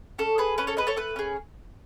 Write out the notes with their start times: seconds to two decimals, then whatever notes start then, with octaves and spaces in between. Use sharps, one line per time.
0.19 C#4 A4
0.38 G#4 B4
0.58 C#4 B4
0.67 A4 C#5
0.77 G#4 B4 D#5
0.87 A4 C#5
0.96 A3 B4
1.16 C#4 G#4